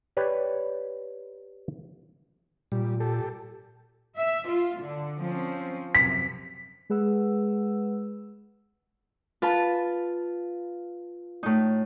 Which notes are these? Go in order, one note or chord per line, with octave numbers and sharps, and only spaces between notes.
G4 B4 C#5 D5
A#2 G3
G4 A4
E5
F4
D3
F3 C4 C#4
F#2 C3 B6
G#3 G#4 B4 F#5 E6
F4 B4 A5
A2 D#4